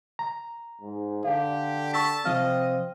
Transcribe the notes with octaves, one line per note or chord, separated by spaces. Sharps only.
A#5
G#2
D3 G4 F5
A5 C#6 E6 B6
C3 F3 C4 D#5 F5 F6